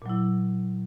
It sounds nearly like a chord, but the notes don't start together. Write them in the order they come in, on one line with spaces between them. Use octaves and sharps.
A#2 F#3 E4